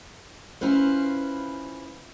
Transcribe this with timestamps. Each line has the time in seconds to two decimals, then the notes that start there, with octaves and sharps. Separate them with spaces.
0.61 C#4 E4 F4 B4 C5